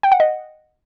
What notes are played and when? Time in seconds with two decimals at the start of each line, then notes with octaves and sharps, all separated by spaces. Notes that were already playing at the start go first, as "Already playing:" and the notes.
0.03 G5
0.12 F#5
0.20 D#5